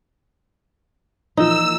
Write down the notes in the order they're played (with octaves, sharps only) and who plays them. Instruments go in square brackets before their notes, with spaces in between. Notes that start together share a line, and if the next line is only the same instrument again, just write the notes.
[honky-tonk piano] A#2 E3 F3 [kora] D#4 [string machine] E6